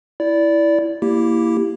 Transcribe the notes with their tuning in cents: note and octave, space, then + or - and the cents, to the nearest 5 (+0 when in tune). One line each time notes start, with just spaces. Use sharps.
E4 +0 D5 -15
A#3 -5 E4 +0 G4 +0